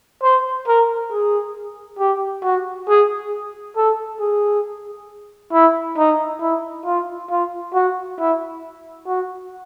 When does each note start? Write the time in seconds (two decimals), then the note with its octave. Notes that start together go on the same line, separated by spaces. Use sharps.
0.23 C5
0.67 A#4
1.11 G#4
1.99 G4
2.43 F#4
2.88 G#4
3.76 A4
4.20 G#4
5.53 E4
5.97 D#4
6.41 E4
6.86 F4
7.31 F4
7.74 F#4
8.19 E4
9.07 F#4